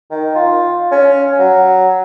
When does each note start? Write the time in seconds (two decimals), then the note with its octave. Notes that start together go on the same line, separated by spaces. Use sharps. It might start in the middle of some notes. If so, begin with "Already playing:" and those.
0.10 D#3
0.35 F4
0.91 C#4
1.39 F#3